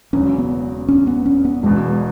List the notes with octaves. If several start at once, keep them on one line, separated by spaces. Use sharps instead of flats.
E1 E2 C#3 F#3 C#4
B3
C#4
B3
C#4
B3
E1 E2 B2 G#3